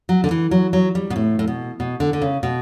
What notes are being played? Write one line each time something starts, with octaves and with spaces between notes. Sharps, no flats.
F#3
D3
E3
F#3
F#3
G3
B2
A2
A2
B2
B2
D3
D3
C#3
B2